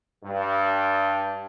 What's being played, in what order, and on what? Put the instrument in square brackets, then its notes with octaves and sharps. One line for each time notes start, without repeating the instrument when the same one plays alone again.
[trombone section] G2